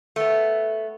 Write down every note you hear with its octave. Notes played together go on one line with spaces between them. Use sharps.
A3 B3